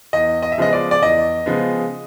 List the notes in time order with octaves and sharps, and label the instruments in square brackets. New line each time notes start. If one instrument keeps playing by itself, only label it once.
[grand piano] E2 D#5
D#5
E5
C#3 F3 G#3 B3 D#5
D5
D5
E2 D#5
C#3 F3 G#3 B3